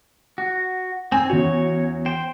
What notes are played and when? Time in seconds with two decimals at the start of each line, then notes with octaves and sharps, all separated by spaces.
0.38 F#4
1.12 C4 G#5
1.30 E2 C#4 F#4 C#5
2.06 C5 G5